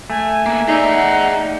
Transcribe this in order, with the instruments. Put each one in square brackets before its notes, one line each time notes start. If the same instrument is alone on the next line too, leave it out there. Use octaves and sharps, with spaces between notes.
[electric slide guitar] A3 [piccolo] G#5
[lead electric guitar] A#3 B3
[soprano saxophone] D#4 [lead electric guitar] G#4 D5 [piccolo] E5
[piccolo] F#5